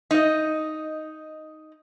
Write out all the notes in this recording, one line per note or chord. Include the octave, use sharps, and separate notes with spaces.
D#4 D#5